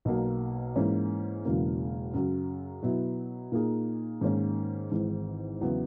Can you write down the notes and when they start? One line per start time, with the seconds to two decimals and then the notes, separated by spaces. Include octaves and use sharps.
0.05 B1 B2 F#3 A#3
0.74 G#2 E3 A#3 C#4 E4
1.45 E1 E2 C#3 F#3 A#3
2.14 F#2 C#3 F#3
2.83 B2 F#3 B3 E4
3.52 A#2 A#3 D#4 G#4
4.21 G#2 D#3 A#3 C#4
4.92 G#1 G#2 E3
5.61 E2 C#3 F#3 B3 E4